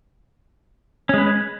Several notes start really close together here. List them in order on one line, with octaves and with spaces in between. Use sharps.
C#4 G#3 B4